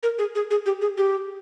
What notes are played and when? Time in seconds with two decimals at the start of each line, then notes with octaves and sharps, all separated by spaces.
0.03 A#4
0.19 G#4
0.35 G#4
0.51 G#4
0.66 G4
0.81 G#4
0.97 G4